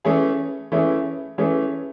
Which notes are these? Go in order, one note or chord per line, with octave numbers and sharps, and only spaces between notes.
E3 A3 C#4 E4 G#4
E3 A3 C#4 E4 G#4
E3 A3 C#4 G#4